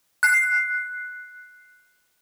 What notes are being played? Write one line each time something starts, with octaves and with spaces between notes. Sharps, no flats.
F#6 C7